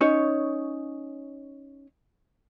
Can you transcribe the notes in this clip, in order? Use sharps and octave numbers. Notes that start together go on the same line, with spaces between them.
C#4 D#4 C#5